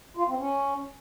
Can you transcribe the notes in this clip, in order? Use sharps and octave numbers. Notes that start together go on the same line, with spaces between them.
F4
C4
C#4